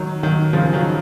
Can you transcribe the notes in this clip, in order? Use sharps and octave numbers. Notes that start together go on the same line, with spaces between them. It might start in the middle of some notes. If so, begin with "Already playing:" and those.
Already playing: D#3 F#3
D#3 F#3
C#3 F3
D#3 F#3